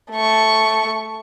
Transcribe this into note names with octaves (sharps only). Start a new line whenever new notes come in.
A3 C#6